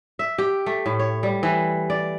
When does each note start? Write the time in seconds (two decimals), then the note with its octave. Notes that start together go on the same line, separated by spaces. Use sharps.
0.19 E5
0.38 G4
0.66 A3
0.86 A2
0.99 C#5
1.23 G3
1.43 E3
1.90 D5